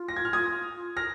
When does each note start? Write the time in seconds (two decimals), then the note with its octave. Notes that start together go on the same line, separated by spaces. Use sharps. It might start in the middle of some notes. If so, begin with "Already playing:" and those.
Already playing: F4
0.08 A#6
0.16 G#6
0.25 F6
0.33 D#6 G#6
0.97 F6 A#6